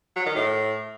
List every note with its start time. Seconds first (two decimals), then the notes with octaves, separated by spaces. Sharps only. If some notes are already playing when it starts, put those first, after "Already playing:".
0.16 F#3
0.26 D#3
0.36 A2